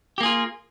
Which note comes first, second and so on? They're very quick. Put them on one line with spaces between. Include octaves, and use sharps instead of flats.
G4 A#3 G#4 F4